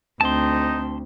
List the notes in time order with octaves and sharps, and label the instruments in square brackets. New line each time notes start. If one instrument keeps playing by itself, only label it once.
[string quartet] D2 [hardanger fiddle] C4 [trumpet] D#4 [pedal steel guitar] A5 C6